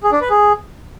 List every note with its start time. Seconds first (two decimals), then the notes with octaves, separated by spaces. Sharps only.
0.03 G#4
0.12 D4
0.21 B4
0.30 G#4